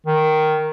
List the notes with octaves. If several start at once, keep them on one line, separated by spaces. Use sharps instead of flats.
D#3